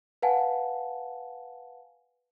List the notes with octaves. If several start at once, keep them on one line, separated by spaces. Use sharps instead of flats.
B4 F5 F#5 G#5 A5